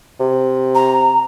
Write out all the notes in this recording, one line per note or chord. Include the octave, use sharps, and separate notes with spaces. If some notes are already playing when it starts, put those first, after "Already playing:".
C3
A#5